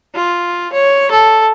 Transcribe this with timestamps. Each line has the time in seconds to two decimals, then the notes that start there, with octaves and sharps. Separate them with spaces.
0.15 F4
0.73 C#5
1.11 A4